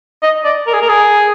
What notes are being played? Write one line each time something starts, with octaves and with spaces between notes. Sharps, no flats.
D#5
D5
A#4
G#4
A#4
G#4